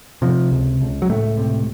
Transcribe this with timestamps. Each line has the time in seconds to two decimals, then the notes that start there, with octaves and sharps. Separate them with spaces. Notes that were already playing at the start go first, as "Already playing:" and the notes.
0.22 C3 F3
0.52 C#2
0.81 C#2
1.02 F#3
1.09 C#2 A2 A3
1.37 C3